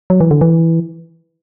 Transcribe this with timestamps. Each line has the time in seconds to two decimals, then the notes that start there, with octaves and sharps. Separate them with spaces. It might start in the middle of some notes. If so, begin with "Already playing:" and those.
0.10 F#3
0.21 E3
0.31 D3
0.41 E3